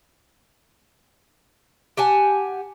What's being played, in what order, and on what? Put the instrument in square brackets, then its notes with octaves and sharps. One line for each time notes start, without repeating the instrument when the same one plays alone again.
[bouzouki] G4 F#5 G#5 A5